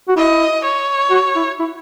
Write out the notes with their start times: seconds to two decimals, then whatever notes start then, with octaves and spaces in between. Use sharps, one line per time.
0.08 F#4
0.16 E4 D#5
0.64 C#5
1.11 F#4
1.35 E4
1.59 E4